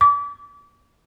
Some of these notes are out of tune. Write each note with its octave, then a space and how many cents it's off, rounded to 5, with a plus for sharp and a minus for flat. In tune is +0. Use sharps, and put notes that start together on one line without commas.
D6 -35